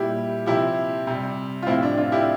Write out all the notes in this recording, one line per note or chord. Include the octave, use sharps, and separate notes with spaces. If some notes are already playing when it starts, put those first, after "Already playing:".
Already playing: A#2 G3 E4 G4
C3 F3 E4 G4
C3 G3
F4
A2 F3 C4 E4
D4
D4 F4
E4 G4